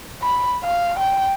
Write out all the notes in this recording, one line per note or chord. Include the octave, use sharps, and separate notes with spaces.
B5
F5
G5